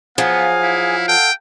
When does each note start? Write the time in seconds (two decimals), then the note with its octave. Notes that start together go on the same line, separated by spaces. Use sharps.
0.18 F3 F#3 B3 G#4 F5 G#5
0.63 E4
1.08 A4 F#5 G5